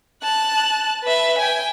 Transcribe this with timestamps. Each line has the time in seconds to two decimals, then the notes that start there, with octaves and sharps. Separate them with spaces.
0.23 A5 F#6
1.04 B4 E5
1.38 G5 G#5